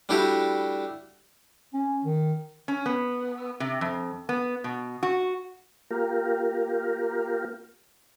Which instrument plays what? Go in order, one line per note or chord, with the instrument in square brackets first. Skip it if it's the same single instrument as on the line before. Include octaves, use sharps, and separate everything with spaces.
[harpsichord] G3 A3 D4 E4 F#4 G4
[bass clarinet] C#4
D#3
[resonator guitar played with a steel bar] C#4
B3
C3
F2
B3
B2
F#4
[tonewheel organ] A#3 F4 G4 A#4